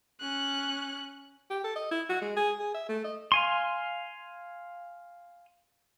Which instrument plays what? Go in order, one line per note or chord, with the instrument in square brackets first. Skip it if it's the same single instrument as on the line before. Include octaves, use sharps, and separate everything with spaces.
[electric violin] C#4 F#6
[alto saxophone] G4
A4
D#5
E4
F#4
G#3
G#4
G#4
E5
A3
D#5
[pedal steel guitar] F5 G#5 C6